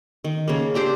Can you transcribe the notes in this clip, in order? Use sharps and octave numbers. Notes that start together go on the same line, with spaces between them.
D#3
C#3 A#3
C4 D4 G4 C5